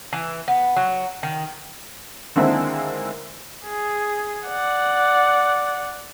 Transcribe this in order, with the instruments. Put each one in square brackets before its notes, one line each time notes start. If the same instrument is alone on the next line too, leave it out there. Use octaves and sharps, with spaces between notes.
[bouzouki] E3
B3
F#3
D#3
[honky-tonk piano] D3 D#3 G#3 A#3 C4 E4
[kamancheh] G#4
D5 F#5